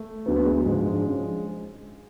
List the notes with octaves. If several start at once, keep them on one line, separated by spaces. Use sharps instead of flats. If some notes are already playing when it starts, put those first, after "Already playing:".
Already playing: A3
D2 D3 F#3 B3
B3
G#3
F#3
G#2 F3 G#3
D4
F3 C#4